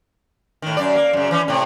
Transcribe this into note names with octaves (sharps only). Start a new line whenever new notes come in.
A2 D#3
F#2 D5
A#3
F#2 C#3
E3 C#4
A2 C3